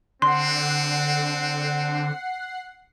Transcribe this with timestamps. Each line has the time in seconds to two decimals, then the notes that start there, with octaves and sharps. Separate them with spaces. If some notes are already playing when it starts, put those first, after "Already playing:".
0.22 D3 C4 F#5 C6 C7